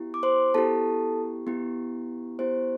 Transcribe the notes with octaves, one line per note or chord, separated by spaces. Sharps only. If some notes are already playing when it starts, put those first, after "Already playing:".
Already playing: B3 E4 G4
D6
C5 C6
B3 E4 G4 A4 A5
B3 E4 G4
B3 E4 G4 C5